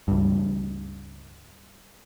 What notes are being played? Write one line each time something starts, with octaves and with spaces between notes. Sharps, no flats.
C#2 G2